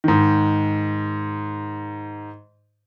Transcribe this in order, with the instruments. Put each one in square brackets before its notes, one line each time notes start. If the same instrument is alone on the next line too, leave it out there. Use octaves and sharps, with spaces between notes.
[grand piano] G#2 D#3